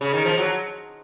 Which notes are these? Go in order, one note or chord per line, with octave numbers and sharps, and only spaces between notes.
C#3
D#3
F3
F#3